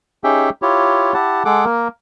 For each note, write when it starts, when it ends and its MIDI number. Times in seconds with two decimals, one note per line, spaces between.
0.24 0.50 61
0.24 0.50 63
0.24 0.50 67
0.24 0.50 68
0.24 0.50 76
0.24 0.50 79
0.62 1.14 64
0.62 1.14 65
0.62 1.14 67
0.62 1.14 73
1.14 1.43 64
1.14 1.43 67
1.14 1.43 78
1.14 1.43 81
1.45 1.65 56
1.45 1.65 68
1.45 1.65 69
1.45 1.65 78
1.45 1.65 86
1.65 1.88 58
1.65 1.88 70